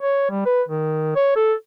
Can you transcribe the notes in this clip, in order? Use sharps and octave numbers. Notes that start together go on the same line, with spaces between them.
C#5
G3
B4
D#3
C#5
A4